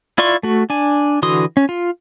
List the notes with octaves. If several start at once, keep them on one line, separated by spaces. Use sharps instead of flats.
E4 F4 D5 C6 C#6
A3 F#4
D4 G#5
D3 E3 F#4 C6 D#6
C#4
F4